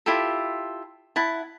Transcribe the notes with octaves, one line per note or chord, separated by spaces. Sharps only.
E4 F4 G4 A4
E4 F#5 A5